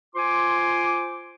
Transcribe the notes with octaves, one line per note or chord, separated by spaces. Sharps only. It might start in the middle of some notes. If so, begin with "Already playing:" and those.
F4 C5 G#5 C6 D6